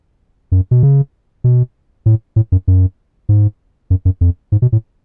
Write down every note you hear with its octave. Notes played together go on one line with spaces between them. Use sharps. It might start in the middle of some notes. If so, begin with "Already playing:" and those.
F#2
B2
C#3
B2
A2
A2
F#2
F#2
G#2
F#2
F#2
F2
G#2
B2
A2